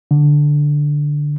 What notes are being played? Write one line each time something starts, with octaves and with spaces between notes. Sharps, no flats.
D3